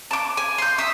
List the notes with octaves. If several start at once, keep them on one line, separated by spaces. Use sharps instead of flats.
A5 D6
G#5
C6 G6
E5 D#6